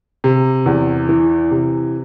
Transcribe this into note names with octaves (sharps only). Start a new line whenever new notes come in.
C3
E2
E3
C3